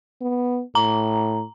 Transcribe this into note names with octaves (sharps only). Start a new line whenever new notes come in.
B3
A2 A#5